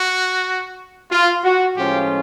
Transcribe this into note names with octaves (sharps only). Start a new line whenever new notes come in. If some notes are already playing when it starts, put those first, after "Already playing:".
Already playing: F#4
F4
F#4
A2 F3 G#3 C#4 F4 G4